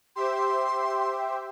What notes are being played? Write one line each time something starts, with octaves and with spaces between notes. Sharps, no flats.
G4 C5 E5 C6